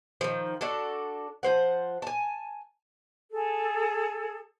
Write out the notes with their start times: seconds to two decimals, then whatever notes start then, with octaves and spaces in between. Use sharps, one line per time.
0.21 D#3 F3
0.61 D4 F#4 A4
1.43 F3 C5 F#5
2.02 G#5 A5
3.32 G#4 A4